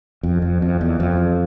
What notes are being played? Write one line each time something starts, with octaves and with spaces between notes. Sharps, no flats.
F2
F2
F2
E2
F2